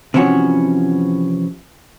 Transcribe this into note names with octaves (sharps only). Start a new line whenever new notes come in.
C3 E3 F3 C#4 F#4